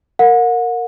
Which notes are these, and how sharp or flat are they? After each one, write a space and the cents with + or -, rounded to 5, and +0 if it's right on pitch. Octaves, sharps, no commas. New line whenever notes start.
A#4 -15 F#5 -35